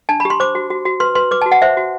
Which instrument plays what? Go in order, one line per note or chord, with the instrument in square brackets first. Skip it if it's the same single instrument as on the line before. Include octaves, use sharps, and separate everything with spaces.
[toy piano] D4 A5
B5
G4
C6
C5 D6
F#4
F#4
F#4
B4 C6
B4 C6
B4 D6
A5
F#4
F#5
C5 E5
F#4